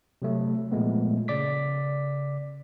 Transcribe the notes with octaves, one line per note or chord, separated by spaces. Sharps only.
C3 F#3 A3
A#2 F3 G#3 A3 B3
C#3 D5 D6 B6